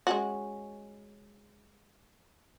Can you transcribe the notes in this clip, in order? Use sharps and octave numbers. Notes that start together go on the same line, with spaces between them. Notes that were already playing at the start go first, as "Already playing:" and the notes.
G#3 C#4 F#4